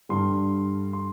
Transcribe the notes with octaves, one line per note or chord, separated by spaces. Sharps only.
G2 D3 G3 C6
C6